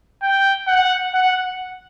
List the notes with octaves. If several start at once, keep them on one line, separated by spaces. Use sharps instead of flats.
G5
F#5
F#5